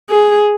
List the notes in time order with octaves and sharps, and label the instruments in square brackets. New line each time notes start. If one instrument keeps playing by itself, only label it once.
[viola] G#4